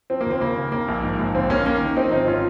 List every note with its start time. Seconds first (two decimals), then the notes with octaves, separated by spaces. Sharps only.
0.10 F3 C4
0.21 A#3
0.26 D#2 C4
0.41 C#3 A#3
0.57 D#2
0.72 D#3 A#3
0.88 A#1
1.04 G#2
1.19 A#1
1.35 D#2 C4
1.50 D#2 A#3 C#4
1.66 D#3 A#3 C#4
1.81 D#3
1.97 F3 C4 D#4
2.12 G#1 C4 D#4
2.28 C#4 F4